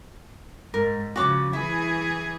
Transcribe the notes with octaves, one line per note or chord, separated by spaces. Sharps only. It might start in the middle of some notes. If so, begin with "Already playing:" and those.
G#2 A#4
C#3 F3 F#4 C#5 D6
E3 E4 G#4